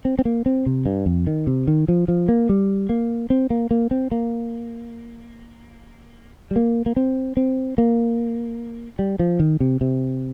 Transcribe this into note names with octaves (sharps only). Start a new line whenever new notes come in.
C4
C4
A#3
C4
C3
G2
F2
D#3
C3
D#3
F3
F3
A#3
G3
A#3
C4
A#3
A#3
C4
A#3
G3
A#3
A#3
C4
C4
A#3
G3
F3
D#3
C3
C3